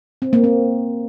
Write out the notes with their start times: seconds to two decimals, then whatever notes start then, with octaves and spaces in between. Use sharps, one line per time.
0.22 C4
0.33 A#3
0.44 C4